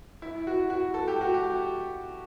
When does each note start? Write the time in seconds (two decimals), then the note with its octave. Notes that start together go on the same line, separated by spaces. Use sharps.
0.22 E4
0.47 F#4
0.70 F#4
0.94 A4
1.08 G4
1.21 F#4
1.34 G4